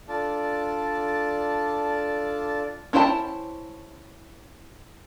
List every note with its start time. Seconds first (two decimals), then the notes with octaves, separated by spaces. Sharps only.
0.09 D4 F4 A4 D5 A5
2.93 C#4 E4 C5 G5 A5